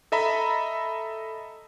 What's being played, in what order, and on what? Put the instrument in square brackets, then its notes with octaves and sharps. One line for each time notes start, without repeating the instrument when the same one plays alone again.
[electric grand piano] A4 D#5 E5 A#5 B5